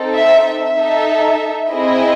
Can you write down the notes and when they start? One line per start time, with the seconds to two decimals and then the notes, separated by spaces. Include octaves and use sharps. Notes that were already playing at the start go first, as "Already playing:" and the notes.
Already playing: C4 D#4 A4
0.16 E5
0.47 E5
0.78 D#4 A4
1.71 C4 E4 G#4 D#5